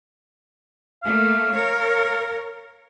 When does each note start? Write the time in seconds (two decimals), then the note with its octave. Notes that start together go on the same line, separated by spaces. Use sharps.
1.03 A3 A#3 F5
1.53 A#4 C#5